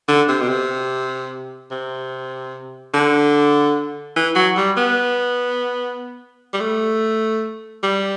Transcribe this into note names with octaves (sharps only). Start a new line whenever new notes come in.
D3
C3
B2
C3
C3
D3
E3
F#3
G3
B3
G3
A3
G3